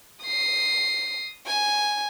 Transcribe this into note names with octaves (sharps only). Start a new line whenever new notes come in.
D#6 C7
G#5